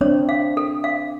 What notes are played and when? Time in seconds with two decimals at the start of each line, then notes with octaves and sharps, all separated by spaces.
0.01 C4 D4 C#5
0.29 F5
0.57 A4
0.84 F5